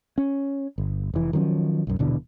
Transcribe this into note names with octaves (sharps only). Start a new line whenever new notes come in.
C#4
G1
F1 E3
D#3 F3 F#3 C#4
B1 F#2
D#1 B2 D3 E3